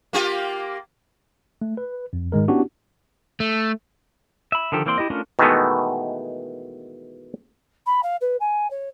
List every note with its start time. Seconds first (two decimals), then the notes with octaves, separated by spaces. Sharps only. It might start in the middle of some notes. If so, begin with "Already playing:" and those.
0.13 A#3 F4 G4
1.62 A3
1.77 B4
2.13 F2
2.32 G#2 D#3 G#3 A#4
2.48 B3 C#4 D4 E4 F#4 G4
3.40 A3
4.52 E5 B5
4.72 D3 D#3 F3 G4 A4
4.86 E3 A#3 C4 D5 C6
4.98 E4 G4 D#5
5.10 A3 C#4 D4 F4 A#4
5.39 B2 D#3 E3 G#3 A3 B3
7.86 B5
8.03 F5
8.21 B4
8.40 G#5
8.70 C#5